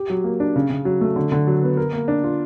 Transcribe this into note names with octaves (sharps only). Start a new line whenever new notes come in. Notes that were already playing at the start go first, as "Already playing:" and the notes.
Already playing: G4
F#3
A#3
D4
C#3
C#3
F#3
A3
D3
D3
F#3
B3
A#4
A#3
D4
F4